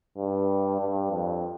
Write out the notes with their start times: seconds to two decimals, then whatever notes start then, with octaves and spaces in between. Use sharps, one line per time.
0.17 G2
0.81 G2
1.11 F2